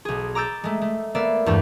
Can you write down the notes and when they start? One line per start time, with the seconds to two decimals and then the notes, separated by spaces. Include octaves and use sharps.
0.05 B1 G#4
0.35 A#5 D6 E6 G6 A6
0.64 G#3 A3
0.82 A3
1.15 A#3 B3 D5 E5
1.46 E2 G2 A3